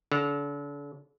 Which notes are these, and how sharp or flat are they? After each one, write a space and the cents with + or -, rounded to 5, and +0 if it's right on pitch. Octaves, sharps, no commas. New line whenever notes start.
D3 -40